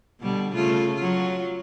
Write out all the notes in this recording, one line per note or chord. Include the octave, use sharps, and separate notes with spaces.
B2 D3 G3
C#3 A3 F4
F#3 F4